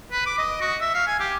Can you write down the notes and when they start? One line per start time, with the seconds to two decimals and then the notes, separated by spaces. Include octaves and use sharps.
0.11 B4
0.26 D6
0.38 D#5
0.61 F#4
0.81 E5
0.94 F5
1.07 G#5
1.20 G4